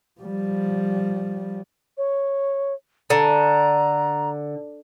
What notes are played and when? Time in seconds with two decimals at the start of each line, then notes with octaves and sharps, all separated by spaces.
0.21 F3 G3
1.97 C#5
3.10 D3 A#5